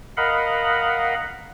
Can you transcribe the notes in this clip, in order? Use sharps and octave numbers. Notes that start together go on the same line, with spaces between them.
A#4 D#5 F5 F#5 B5